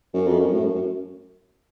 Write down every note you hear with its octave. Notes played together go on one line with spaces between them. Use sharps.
F#2
F2
F#2
A2
F#2
F#2